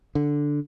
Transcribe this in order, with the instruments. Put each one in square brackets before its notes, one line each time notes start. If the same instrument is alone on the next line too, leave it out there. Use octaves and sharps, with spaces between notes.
[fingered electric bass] D3